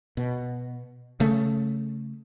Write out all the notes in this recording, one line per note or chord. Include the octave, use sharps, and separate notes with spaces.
B2
C#3 A3